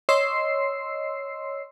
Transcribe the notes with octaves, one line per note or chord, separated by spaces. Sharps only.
C#5 D#5 C6 E6 C7